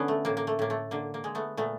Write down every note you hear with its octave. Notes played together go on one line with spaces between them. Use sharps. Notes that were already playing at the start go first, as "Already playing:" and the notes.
Already playing: D3 B3 C#4
A3
A2 A#3
A#3
A3
A2 A#3
A3
D3 A#3
A#3
G#3
A3 B3
A#2 A3 B3